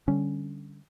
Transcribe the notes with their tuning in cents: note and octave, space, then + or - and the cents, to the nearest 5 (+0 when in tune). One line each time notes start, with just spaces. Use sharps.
D3 +0 G3 +0 C#4 +5